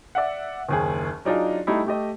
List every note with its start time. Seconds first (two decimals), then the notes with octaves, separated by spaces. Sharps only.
0.15 D5 E5 F#5
0.69 F#1 D#2 G#4
1.25 F#3 D4 D#4 F4 G#4
1.67 G3 A3 D#4 E4
1.86 A3 G4 D#5